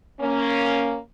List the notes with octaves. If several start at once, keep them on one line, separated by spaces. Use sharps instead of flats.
A#3 C#4